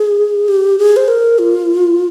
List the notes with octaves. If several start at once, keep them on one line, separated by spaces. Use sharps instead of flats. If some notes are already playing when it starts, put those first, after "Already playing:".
Already playing: G#4
G4
G#4
C5
A#4
F4